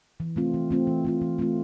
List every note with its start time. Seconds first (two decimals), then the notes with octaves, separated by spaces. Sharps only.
0.20 E3
0.36 A3 C4 F4
0.54 E3
0.71 A3 C4 F4
0.87 E3
1.04 A3 C4 F4
1.22 E3
1.39 A3 C4 F4